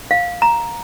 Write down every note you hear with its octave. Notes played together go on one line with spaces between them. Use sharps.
F5
A#5